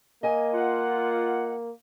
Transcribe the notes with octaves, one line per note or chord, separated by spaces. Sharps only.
A#3 D#5 G#5
F4 F#5